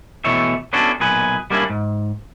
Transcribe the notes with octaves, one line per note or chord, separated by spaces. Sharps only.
B2 E3 A3 C#5 E5
B3 C#4 D4 E4 F#4 A4
B1 A#2 G#4 B4
G3 A#3 C#4 D4 E4
G#2